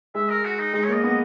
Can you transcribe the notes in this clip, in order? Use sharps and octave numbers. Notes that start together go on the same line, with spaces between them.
G#3 E5
A#4
F#4
D#4
G#3 D#4
C#5
A#3 D#5
B3 D#5